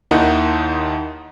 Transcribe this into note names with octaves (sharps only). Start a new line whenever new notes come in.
D#2 D#3 D#4 E4 F#5